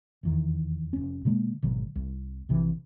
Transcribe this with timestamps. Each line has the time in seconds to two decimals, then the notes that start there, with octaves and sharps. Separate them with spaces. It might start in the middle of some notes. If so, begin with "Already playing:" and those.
0.23 F1 E2 D#3
0.93 F1 C#4
1.25 B2 D3 G#3 A#3
1.63 G#1 B2 D3 F#3
1.95 C2
2.49 A#1 C3 E3